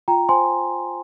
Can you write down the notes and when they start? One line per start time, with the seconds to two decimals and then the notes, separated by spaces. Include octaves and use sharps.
0.08 F4 G5 A#5
0.29 C5 G#5 C6